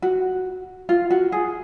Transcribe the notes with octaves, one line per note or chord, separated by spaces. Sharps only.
F#4
F4
F#4
G#4